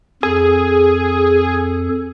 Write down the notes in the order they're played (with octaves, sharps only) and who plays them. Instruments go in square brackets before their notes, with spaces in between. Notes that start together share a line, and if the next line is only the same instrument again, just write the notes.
[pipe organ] F2 A4 [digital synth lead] G#4